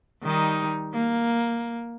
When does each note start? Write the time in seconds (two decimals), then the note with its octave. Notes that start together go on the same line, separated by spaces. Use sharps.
0.23 D#3 G3 D#4
0.94 A#3